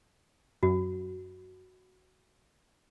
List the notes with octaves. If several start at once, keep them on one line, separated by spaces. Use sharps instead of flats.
F#2 F#4